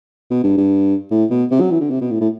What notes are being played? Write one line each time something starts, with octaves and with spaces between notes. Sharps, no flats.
B2
G2
G2
A2
B2
C3
F#3
E3
D3
C3
B2
A2
A2